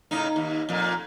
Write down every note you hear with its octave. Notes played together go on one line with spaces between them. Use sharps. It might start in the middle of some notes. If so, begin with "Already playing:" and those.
A2 C#3 D#4
D#2
F2 A#2